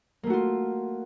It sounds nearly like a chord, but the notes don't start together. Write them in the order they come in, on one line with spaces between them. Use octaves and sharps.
A#3 A3 F#4 F4